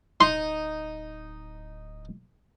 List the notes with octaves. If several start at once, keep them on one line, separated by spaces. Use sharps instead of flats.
D1 D#4 C6